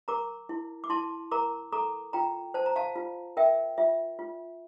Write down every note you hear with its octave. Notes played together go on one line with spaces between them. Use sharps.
A#4 A#5 D6
E4
D6
E4 A5 C6
A#4 A#5 D6
A4 A#5 D6
F4 G5 A#5
C5 A5
A#5
F5 A5
F4
A#4 E5 G5
F4 E5
F4